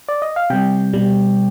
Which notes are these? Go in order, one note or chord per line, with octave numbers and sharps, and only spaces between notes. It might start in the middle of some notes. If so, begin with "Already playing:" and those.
D5
D#5
F5
C3 G3 G5
B2 G3